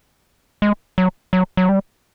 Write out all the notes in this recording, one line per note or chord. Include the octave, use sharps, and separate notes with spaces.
G#3
F#3
F#3
F#3
G3